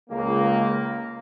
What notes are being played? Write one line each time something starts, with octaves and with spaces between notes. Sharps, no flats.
C#2 A#3